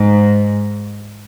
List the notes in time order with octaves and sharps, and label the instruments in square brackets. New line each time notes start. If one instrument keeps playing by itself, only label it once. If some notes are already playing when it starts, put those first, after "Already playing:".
Already playing: [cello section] G#2